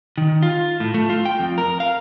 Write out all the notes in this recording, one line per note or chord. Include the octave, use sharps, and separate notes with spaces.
D#3
F4
A2
A3
F4
G5
F2
A#4
F5